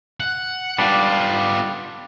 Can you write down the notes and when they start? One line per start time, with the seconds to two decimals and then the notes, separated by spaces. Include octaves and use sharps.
0.20 F#5
0.79 G3 B3 D4 F4